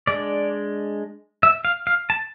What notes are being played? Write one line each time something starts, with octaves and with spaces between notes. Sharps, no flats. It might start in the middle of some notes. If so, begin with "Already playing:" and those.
G#3 D4 D5
E5
F5
F5
A5